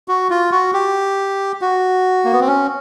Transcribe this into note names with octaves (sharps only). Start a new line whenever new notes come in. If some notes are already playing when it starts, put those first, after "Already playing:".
F#4
F4
F#4
G4
F#4
A#3
B3
C4
C#4